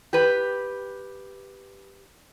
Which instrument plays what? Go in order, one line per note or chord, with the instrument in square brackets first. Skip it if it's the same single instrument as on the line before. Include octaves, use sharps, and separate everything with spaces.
[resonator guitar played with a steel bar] G4 B4